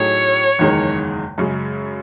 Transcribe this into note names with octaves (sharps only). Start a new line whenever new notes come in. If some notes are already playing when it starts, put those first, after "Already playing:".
Already playing: A2 F#3 A3 D#4 G#4 C#5
F#1 E2 D#3 G#3
F#2 C#3 G#3